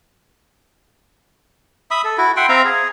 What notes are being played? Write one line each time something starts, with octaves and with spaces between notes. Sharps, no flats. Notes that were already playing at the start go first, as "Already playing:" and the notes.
E5 B5 D#6
A4
E4 F#4
E5 F#5 G5 C6
C4 E5 F5 A#5
G#4